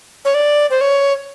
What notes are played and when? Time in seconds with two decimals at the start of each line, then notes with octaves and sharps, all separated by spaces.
0.25 C#5
0.34 D5
0.70 C5
0.81 C#5